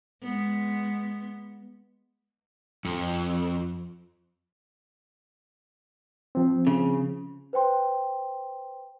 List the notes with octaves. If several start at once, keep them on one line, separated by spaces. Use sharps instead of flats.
G#3 B3
F2
F3 C4
C#3
B4 C5 G5 C6